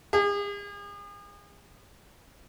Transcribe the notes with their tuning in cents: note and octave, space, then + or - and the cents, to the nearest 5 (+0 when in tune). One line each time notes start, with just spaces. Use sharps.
G#4 -40